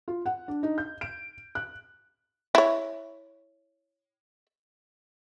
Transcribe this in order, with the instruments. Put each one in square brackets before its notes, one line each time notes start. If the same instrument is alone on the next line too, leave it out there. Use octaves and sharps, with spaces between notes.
[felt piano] F4
F#5
D4
D#4
G6
D7
F#6
[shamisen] E4 C#5